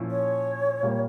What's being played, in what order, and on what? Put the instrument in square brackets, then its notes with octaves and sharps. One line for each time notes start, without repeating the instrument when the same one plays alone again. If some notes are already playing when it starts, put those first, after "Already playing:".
Already playing: [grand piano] A#2 F3 C#4 E4
[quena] C#5
[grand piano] A#2 G3 A#3